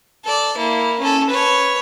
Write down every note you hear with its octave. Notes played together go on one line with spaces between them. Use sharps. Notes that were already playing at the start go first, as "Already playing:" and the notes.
A4 D5
A#3 E4
C#4 A4
B4 C#5